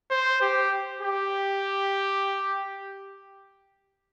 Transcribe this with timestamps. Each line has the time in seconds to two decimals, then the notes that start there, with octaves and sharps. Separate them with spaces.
0.11 C5
0.41 G4
1.01 G4